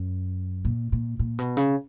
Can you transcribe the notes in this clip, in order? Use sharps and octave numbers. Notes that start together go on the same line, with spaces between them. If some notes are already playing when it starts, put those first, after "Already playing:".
Already playing: F#2
A#2
A#2
A#2
B2
C#3